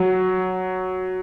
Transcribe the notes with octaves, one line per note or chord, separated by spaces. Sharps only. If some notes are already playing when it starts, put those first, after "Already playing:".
Already playing: F#3